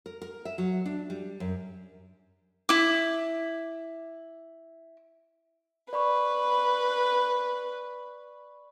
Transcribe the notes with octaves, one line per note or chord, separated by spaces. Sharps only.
A#4
A#4
E5
F#3
D4
G3
F#2
E4 D6
B4 D5 B5 C#6